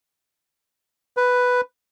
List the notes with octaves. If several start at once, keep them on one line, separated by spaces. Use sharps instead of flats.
B4